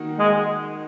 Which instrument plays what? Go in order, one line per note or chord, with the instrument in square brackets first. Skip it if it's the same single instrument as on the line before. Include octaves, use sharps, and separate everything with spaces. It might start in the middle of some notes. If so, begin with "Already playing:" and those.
Already playing: [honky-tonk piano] D#3 A#3 D#4 F#4
[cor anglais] G#3